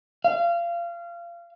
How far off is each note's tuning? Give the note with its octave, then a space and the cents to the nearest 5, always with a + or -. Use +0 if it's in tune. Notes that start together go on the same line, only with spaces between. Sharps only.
F5 -25